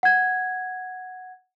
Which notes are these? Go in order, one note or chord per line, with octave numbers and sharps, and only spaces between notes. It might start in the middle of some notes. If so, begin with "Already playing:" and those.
F#5 G#6